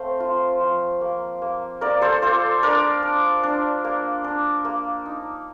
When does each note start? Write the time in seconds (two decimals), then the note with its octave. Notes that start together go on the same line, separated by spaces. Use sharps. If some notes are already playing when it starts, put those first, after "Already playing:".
Already playing: A3 C4 C5 F5
0.20 F4
0.60 F3
1.01 A#3
1.42 A#3
1.81 A#3 A#4 D5
2.01 A4 C5
2.22 F4 A4 C5
2.63 D4 A#4 D5
3.03 D4
3.43 D4
3.84 A#3
4.24 D4
4.65 A#3
5.06 D#4